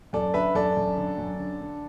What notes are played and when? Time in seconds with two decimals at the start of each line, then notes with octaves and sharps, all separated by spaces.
0.13 F#2 A4 D5
0.34 D3 B4 E5
0.55 F#2 A4 D5
0.77 F#2
0.97 D3
1.18 F#2
1.39 D3
1.60 D3